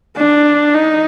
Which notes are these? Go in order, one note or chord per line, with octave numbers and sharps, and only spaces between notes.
D4
D#4